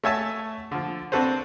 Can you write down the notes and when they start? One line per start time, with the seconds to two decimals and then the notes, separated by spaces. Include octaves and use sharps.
0.04 A3 F#4 C#5 E5 G#5 A5
0.71 D3 F3
1.12 C4 D4 F#4 A4 B4 C5